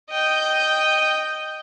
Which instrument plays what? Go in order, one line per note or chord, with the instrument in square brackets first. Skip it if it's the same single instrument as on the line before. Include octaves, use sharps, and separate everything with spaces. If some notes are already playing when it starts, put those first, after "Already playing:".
[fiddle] D#5 G5